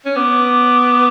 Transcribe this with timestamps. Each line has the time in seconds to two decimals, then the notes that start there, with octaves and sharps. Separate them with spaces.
0.06 C#4
0.16 B3 D6